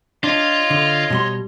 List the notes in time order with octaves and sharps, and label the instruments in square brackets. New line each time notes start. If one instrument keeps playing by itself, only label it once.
[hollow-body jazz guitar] D4 [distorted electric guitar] F4 [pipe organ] C#5 D#5
[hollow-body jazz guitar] D3
B2 G3 C6